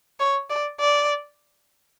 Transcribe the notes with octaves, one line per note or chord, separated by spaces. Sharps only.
C#5
D5
D5